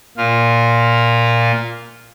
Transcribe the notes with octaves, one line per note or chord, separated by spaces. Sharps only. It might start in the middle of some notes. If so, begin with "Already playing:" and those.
A#2 F4